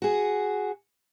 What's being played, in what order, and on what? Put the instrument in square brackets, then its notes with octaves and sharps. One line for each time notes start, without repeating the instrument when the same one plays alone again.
[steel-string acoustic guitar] F#4 G#4